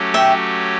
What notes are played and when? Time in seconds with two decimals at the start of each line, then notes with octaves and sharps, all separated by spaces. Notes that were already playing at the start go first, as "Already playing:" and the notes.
Already playing: F#3 A3 C#4 G4
0.14 E5 G5